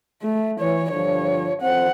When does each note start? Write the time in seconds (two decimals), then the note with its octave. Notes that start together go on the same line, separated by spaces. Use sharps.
0.22 A3
0.60 E3 C#5
0.91 G2 D3 F3 C#5
1.62 F2 C4 C5 F#5